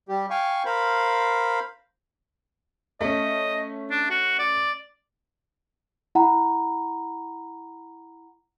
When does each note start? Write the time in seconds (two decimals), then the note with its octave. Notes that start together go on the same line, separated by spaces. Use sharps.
0.09 G3 G4
0.30 F5 G5 G#5 C#6
0.65 A#4 C5 F5 B5
3.01 A3 C#4 D#5
3.91 D4
4.10 F#4
4.39 D5
6.15 E4 F#5 A#5 B5